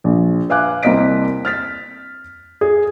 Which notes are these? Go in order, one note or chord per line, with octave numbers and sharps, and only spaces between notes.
A#1
B4 E5 F5 G#5 D6 F#6
C2 A#3 C4 D#5 B6 D7
F6 A6 B6
G#4